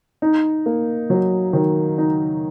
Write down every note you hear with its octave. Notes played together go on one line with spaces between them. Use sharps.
D#4
A#3
F#3
D#3
D#4